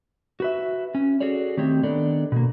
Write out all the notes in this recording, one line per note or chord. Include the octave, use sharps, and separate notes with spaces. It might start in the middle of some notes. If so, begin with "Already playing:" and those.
F#4 B4 E5
C#4
F#4 G#4 A4 C#5 D5
D#3 A3 C4 G4 C#5
D#3 B3 D4 A4 D5
B2 A#3